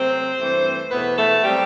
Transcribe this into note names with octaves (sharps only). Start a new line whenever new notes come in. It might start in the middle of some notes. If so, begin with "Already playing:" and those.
Already playing: C3 F#3 A3 C4 C5
G2 E3 A3 C4
E2 B2 A3 B3 B4
A3 A4
F#3 G3 C4 G4